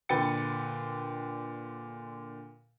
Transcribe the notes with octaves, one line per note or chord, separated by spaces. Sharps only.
A#2 D3 B4 G5 A6 C#7